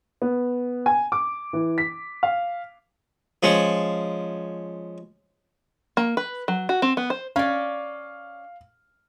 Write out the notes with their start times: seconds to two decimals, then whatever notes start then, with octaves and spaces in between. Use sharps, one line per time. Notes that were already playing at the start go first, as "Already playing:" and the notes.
0.22 B3
0.86 G#5
1.12 D6
1.53 E3
1.78 B6
2.23 F5
3.43 F3 G#3 C#4
5.97 A#3
6.17 B4
6.48 F#3
6.69 F#4
6.82 C4
6.97 B3
7.10 C5
7.36 C#4 D5 F5